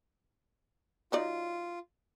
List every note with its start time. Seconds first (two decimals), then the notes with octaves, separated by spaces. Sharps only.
1.12 F#3 D#4 F4 D5